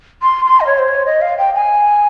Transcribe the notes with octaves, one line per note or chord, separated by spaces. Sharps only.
C6
C6
D#5
C#5
C5
C#5
D#5
F5
G5
G#5